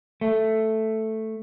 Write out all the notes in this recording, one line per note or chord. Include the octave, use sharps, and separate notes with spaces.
A3